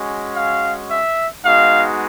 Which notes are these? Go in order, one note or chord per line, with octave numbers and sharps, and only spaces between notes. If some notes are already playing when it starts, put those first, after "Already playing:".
Already playing: G#3 C#4 F#4
F5
E5
G#3 B3 D#4 F#4 F5